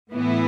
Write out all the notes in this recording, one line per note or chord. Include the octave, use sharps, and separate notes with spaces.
A2 E3 B3 E4